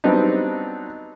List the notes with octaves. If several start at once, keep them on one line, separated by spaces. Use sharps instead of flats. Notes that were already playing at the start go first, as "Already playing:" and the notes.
F#3 G3 B3 C4 D4 D#4